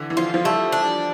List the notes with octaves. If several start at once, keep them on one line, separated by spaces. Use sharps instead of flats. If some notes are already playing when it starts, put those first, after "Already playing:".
Already playing: D3 E3
E3
F3 F4
F3
G3 A3
D4